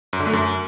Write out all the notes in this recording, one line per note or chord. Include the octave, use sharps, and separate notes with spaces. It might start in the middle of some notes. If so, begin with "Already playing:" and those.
F#2
D3
A3
F#2